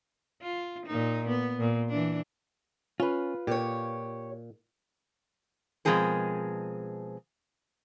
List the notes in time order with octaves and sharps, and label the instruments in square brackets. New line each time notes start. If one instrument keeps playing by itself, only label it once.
[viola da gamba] F4
A#2 D#4
B3
A#2
E3 D4
[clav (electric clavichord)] C#4 [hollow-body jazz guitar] F4 B4
[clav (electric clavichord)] A#2 [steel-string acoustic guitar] G4 C#5
[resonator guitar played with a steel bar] B2 F3 G#3 C4 G#4 A#4